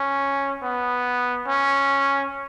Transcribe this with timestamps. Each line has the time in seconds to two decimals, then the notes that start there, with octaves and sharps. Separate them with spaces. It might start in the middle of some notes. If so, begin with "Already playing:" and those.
Already playing: C#4
0.62 B3
1.47 C#4